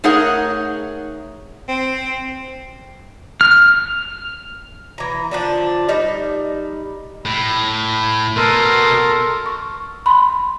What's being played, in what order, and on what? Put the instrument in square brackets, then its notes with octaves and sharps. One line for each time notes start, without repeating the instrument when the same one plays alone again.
[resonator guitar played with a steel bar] A3 D#4 G#4 A#4 C#5 F#5
[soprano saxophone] C4
[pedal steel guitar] F6
[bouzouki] E3 A#5
D3 F3 D4
G3 D#4
[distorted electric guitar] A2 [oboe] B5
[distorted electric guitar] B2 [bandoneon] A4 A#4 [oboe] C6
[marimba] C#6
B5 C6